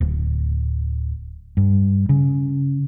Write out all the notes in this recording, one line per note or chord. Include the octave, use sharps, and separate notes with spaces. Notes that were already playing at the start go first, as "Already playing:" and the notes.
D1
G2
C#3